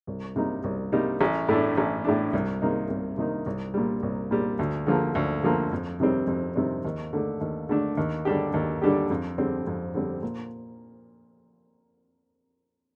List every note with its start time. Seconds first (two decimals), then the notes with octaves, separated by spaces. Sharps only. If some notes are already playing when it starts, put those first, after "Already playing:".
0.07 C2
0.36 C3 G3 A#3 D#4
0.64 C2
0.92 C3 G3 A#3 D#4
1.21 A1
1.49 A2 A3 D4
1.77 A1
2.05 A2 A3 D4
2.33 C2
2.62 C3 D#3 A#3 D#4
2.90 C2
3.18 C3 D#3 A#3 D#4
3.46 C2
3.74 A#2 G3
4.03 C2
4.31 A#2 G3
4.59 D2
4.87 D3 F3 A#3
5.15 D2
5.44 D3 F3 A#3
5.72 F2
6.00 C3 D#3 G3 C4
6.27 F2
6.56 C3 D#3 G3 C4
6.85 D#2
7.13 D3 A3 D4
7.41 D#2
7.69 D3 A3 D4
7.97 D#2
8.25 D3 G3 D4 G4
8.54 D#2
8.82 D3 G3 D4 G4
9.10 F2
9.38 D3 G3 C4
9.67 F2
9.94 D3 G3 C4
10.23 A#2